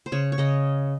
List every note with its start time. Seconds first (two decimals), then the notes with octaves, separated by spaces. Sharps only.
0.06 C5
0.12 C#3 C#5
0.32 C#5
0.38 C#3 D#5